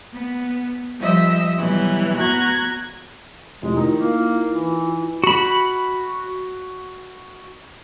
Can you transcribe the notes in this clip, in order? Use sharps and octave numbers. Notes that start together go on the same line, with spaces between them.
B3
F3 G3 D#5 E5 E6
B2 E3 F#3 G3
B3 F#4 A#5 F#6 G#6
F1 G#3 E4 F4
D#3 D#4
A#3
E3
F#4 B5